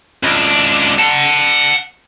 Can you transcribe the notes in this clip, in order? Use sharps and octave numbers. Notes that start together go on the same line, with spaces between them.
C#2 D4
F#5 A5